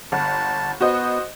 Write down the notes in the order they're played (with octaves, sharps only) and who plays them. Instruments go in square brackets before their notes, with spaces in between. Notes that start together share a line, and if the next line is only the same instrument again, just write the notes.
[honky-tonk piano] G1 F#5 [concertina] A5
[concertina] B3 [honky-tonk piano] F#4 C5 D#5